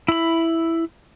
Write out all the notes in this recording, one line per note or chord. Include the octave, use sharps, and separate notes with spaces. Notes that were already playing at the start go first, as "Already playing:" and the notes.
E4 B5